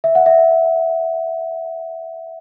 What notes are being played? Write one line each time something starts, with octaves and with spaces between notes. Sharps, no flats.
E5
F#5
E5